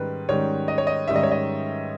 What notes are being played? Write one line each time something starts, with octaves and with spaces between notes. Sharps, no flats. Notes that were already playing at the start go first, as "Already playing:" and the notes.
Already playing: G#2 D#3 G3 C#4 B4
G#2 D#3 G3 C#4 C#5
D#5
C#5
D#5
G#2 D#3 G3 C#4 E5
D#5
C#5
D#5